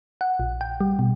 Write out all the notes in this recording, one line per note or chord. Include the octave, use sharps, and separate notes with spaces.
F#5
A#1
G5
G3
B2